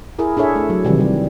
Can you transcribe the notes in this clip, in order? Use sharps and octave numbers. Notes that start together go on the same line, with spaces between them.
E4 G#4 A#4
D4 G#4 A4 C#5 E5
A3
F#3
C3 D#3 E3 G3
G3